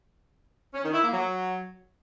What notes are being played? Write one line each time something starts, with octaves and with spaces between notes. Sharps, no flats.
C#4
D#3
E4
A#3
F#3